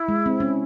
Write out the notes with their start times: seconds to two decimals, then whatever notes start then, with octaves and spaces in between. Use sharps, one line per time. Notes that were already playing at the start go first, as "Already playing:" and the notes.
Already playing: E4
0.08 G#3
0.26 C4
0.40 C#4